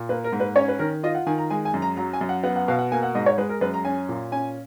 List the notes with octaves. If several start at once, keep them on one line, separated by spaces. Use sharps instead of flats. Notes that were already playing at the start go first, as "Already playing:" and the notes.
Already playing: A#2
A#3 B4
A#4
G#2
B4
C#4 C#5
B4
D#3 A#4
F4 D#5
F#5
D#3 G#5
A#5
G#3 G#5
G#5
F#2
A#5
F#3 A#5
G#5
F#2
F#5
B3 F#5
F#5
B2 F5
F#5
A#3 G#5
F#5
G#2 D#5
C#5
G#3 B4
A#4
F#2 B4
A#5
C#4 G#5
A#2
C#4 G#5